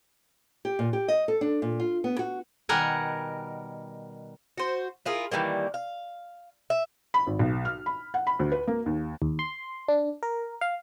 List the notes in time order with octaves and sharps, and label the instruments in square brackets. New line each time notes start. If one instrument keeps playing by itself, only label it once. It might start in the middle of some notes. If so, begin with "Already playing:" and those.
[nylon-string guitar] G4
A#2
G4
D#5
A4
D4
A#2
F4
B3
F#4
[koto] B2 D#3 G3 A#4 F#5 G#5
[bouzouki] F#4 C5
E4 F4 G#4 A#4
D#3 E3 G3 A#3
F5
E5
[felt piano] B5
G#1
B1
F6
B5
F#5
B5
D2
B4
A#3
D#2
[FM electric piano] D#2
C6
D4
A#4
F5